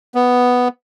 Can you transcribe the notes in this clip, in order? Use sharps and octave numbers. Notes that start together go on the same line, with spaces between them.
B3